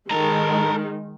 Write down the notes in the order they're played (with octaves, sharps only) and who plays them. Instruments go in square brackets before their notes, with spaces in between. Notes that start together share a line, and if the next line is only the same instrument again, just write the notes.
[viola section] D#3 G#3 [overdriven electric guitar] A4 A#5